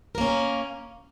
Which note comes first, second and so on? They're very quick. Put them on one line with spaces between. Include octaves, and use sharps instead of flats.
A#4 A#3 C#4